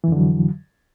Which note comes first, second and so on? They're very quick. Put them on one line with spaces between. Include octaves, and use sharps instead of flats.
E3 F2 D3 F#3